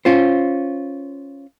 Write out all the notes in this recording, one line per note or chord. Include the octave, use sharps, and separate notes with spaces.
C#4 F4 C5